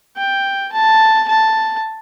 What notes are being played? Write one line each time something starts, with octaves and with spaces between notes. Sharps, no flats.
G5
A5
A5